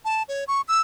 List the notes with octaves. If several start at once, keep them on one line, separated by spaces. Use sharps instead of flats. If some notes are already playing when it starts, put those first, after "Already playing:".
A5
C#5
C#6
E6